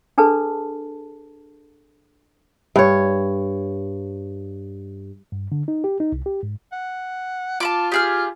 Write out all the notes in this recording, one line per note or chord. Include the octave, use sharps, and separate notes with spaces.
D4 G#4 A4 B4 A5
G2 C#5
G2
D3
D#4
G4
D#4
C2
G4
G#2
F#5
F4 A5 B5 D6
G4 G#4 F6